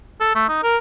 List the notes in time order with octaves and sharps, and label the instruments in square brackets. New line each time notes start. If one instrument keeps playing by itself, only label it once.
[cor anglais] A4
A3
D#4
A#4